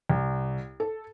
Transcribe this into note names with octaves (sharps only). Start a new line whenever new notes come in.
C2
A4